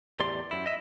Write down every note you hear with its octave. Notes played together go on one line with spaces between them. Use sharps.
E2 A2 G4 D5 C6
F#2 E4
D#5 E5